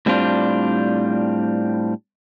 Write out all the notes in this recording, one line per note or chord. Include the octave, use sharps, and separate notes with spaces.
A2 G3 C4 D4 F4